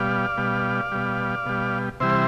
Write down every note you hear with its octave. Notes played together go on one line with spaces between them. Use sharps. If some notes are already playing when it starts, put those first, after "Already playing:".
Already playing: B2 G3 D5 F5
B2 G3
B2 G3
B2 G3
C3 E3 G3 C5 E5